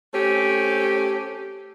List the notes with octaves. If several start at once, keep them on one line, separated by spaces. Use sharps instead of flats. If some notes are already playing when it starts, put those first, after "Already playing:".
A3 C4 C#4 G4